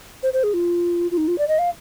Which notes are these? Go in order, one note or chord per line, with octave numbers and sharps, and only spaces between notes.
C5
C5
G#4
F4
F4
D#4
F4
D5
D#5
F5